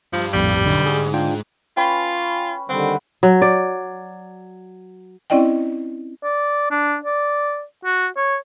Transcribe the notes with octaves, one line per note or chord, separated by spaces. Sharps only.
G2 F3
A#1 F2 A2 G3
B1 D3
G#2 G#4
D4 F4 G5
C#4 F4 B4 G5 B5
D3 D#3 G3 C4 F#5 B5
F#3
D5
C4 C#4 E4 D5 D#5 G5
D5
D4
D5
F#4
C#5